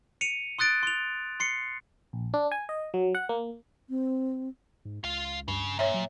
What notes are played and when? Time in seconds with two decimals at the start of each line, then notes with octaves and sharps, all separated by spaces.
0.21 C#7 D#7 F7
0.59 C6 D#6 F#6 A6 D7
0.83 C6 F7
1.40 C6 C7 C#7
2.13 A#1
2.34 D4
2.52 G#5
2.69 D#5
2.94 F#3
3.15 F#5
3.29 A#3
3.90 C4
4.85 G#2
5.04 C#2 F4 F5
5.48 G2 C#3
5.79 A#2 C#5 E5
5.94 F#3